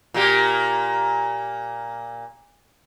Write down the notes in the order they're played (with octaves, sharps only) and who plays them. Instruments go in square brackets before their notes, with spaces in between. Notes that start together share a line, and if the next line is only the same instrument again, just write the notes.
[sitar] A#2 A#3 G4